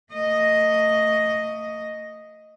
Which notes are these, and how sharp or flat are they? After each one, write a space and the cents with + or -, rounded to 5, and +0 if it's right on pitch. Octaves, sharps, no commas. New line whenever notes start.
A3 +35 D#5 +0